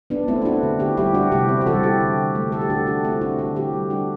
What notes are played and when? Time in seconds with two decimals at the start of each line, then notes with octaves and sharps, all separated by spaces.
0.10 B3 D4
0.28 A3 C4 E4
0.42 E4
0.45 D4 F#4
0.63 D3
0.79 E4 G4
0.97 G3 E4 G4
1.14 D4 F#4
1.32 C3 E4 G4
1.49 C4
1.61 G4
1.66 E3 G3 F#4 A4
1.83 E4 G4
2.00 D3
2.35 A3
2.52 A4
2.61 G4
2.70 D3 D4 F#4
2.87 D4 F#4
3.04 A3 C4 E4
3.21 D4 F#4
3.38 D3 D4 F#4
3.55 E4 G4
3.73 G3
3.90 D4 F#4